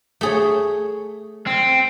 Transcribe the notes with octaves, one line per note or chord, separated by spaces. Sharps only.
A3 G#4 C#5
C4